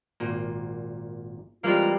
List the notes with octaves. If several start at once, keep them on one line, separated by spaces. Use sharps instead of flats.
G#1 A#2 A#3
E3 G3 G#3 A#3 C4 F4